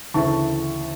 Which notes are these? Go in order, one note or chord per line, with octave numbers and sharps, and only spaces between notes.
D2 C#3 E3 A3 A5 C#6